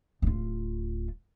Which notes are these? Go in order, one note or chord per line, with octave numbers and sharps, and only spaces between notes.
D1 F4